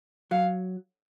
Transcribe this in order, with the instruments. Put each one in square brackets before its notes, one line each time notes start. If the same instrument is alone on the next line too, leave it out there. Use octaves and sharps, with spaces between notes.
[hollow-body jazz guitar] F#3 [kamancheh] F5